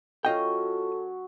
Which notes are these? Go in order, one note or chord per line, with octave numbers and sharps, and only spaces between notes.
F#3 C#4 F4 F#4 A4 D#5 G5